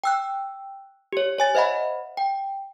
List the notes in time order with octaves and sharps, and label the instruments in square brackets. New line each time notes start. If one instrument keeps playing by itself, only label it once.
[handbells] G5 E6 F#6
G4 C#5
C#5 G#5 A6
C5 D#5 E5 F#5 B5
G5